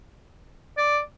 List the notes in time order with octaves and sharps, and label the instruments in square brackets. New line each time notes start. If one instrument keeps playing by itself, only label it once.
[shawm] D5